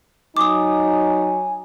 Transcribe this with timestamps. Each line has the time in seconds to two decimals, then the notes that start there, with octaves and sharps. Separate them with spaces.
0.37 F#3 D#4 G#5 D6 D#6